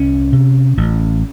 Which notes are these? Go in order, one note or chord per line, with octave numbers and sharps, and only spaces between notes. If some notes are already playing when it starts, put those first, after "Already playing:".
Already playing: C2 C#4
C3
A1